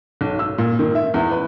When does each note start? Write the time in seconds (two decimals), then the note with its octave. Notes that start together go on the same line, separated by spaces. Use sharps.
0.21 B1
0.39 E6
0.58 A#2
0.79 D#3
0.95 E5
1.14 E2
1.32 B4